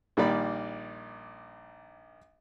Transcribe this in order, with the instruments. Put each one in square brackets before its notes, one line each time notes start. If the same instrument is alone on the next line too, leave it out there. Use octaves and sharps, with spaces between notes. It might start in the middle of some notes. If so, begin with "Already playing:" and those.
[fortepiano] A#1 D#3 G3 A#3 D5 B5